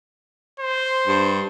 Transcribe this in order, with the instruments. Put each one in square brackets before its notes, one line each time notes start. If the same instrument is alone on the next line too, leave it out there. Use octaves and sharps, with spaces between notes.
[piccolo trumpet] C5
[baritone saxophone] G2